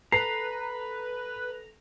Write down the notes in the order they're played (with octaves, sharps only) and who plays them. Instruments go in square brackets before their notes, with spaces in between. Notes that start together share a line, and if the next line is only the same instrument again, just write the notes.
[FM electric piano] A4 [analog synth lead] B4 [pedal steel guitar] A#5 [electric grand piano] C7